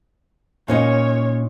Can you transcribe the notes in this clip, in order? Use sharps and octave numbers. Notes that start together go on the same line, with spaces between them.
A#2 C#4 D#4 C#5